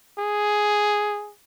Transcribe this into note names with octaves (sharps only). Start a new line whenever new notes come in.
G#4